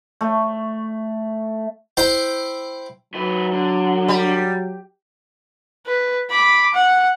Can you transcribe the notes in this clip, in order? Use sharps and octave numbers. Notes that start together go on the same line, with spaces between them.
A3
E4 C5 G5
D#3 F#3 B4
D3
G3
B4
B5 D6
F#5